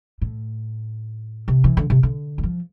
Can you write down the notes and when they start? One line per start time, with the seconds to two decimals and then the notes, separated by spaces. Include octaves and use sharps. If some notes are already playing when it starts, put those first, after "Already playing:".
0.22 A2
1.48 C3
1.64 E3
1.77 D3
1.90 C3
2.03 D3
2.38 G3
2.43 F3